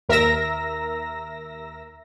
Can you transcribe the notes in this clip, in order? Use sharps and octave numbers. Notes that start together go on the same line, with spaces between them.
D#2 A#4 E5 A#5 E6 A#6